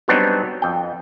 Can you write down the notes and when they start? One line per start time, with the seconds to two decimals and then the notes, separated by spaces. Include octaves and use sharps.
0.08 F#3 G3 B3 C4 D4 D#4
0.62 F2 G5